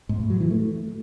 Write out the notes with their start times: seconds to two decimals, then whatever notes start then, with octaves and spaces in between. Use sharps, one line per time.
0.09 G#2
0.20 A2
0.30 F#3
0.40 E3
0.51 A3